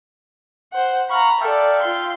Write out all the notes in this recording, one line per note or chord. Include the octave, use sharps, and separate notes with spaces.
C5 F#5
F5 F#5 A#5 B5 C#6
A4 D5 E5 F5 G5
F4 C6